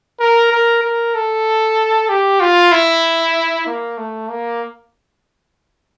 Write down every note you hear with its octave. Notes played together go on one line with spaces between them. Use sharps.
A#4
A#4
A#4
A4
G4
F4
E4
A#3
A3
A#3